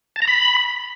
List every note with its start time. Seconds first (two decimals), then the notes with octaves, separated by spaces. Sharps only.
0.16 A5
0.22 A#5
0.28 B5